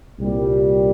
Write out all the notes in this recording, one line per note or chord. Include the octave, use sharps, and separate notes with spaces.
C2 A#2 G3